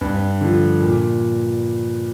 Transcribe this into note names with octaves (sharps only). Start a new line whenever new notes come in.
G2
D3 F3
A#2